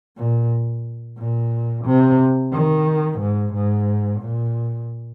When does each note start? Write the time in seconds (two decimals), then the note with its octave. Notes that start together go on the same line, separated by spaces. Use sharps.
0.17 A#2
1.18 A#2
1.85 C3
2.53 D#3
3.19 G#2
3.53 G#2
4.20 A#2